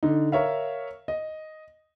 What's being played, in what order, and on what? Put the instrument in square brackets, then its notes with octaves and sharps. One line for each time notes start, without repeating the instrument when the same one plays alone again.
[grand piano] D3 D#4
A#4 C#5 E5 F5
D#5